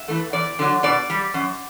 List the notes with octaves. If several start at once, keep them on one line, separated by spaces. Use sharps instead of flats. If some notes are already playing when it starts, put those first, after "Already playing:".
Already playing: E5
E3 A3
E2 D5
D3 F#3
B2 D5
G3
F#2